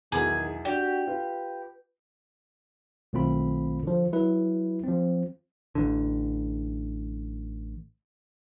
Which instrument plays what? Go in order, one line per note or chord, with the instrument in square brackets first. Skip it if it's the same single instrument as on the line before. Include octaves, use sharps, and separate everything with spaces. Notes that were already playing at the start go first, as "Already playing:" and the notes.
[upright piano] B1 E2 [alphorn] D#3 [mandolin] G#4
[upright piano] D4 [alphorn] F#4 [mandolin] G4
[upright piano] F4 [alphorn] B4
[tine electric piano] B1 D#3 A3 C4 F4 B5
D3 F3
F#3 E4 B4
F3 C4
[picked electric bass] A1 D3